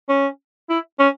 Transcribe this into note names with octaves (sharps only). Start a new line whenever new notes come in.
C#4
E4
C#4